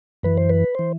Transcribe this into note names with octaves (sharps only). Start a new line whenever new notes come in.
F#2 E3 B4
C5
B4
E3 C5